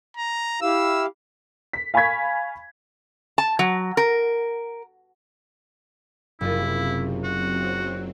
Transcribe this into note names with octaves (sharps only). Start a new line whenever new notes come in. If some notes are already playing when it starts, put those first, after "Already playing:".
A#5
E4 G4 F5 E6
B6
F5 G#5 B5 C#6 G#6 B6
A5
F#3
A#4
F#1 C3 E4 F4
F#3 C4 F#4